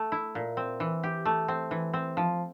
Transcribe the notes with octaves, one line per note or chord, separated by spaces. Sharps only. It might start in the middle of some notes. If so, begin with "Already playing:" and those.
Already playing: A3
E4
A#2
C4
E3
G4
A3
C4
E3
C4
F3